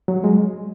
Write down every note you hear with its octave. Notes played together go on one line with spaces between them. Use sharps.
F#3
G#3